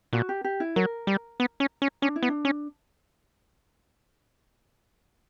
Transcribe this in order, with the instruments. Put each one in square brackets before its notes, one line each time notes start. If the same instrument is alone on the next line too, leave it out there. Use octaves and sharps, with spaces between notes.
[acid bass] A#2 [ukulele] F#4
[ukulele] G4
G4
E4
[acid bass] F#3 [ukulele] A#4
[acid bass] G3
B3
C#4
C#4
[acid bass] C#4 [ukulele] D4
[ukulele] E4
[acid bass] B3
[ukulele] D4
[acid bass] C#4